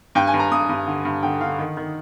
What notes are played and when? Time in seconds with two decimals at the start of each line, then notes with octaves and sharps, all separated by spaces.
0.15 G2 G5
0.27 G#5
0.34 G2
0.40 A#5
0.52 G2 D#6
0.69 G2
0.87 D3
1.05 G2
1.23 D3 G5
1.41 D3 F5
1.59 D#3
1.77 D#3